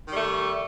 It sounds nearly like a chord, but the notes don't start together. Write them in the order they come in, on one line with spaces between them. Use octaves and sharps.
D#3 G3 A3